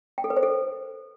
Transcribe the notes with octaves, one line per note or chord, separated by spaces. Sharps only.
G5
A4
B4
C5
A4